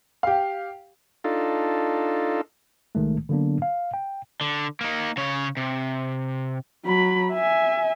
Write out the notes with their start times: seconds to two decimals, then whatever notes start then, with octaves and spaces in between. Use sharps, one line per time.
0.23 G4 F5
1.24 D4 D#4 F4 A4
2.95 C2 D#3 G#3 A3
3.29 D3 F#3 A#3 B3 D4
3.62 F5
3.94 G5
4.41 D3
4.81 A#3 D#4
5.17 C#3 C#5
5.57 C3
6.85 F#3 B5
7.32 E5 G#5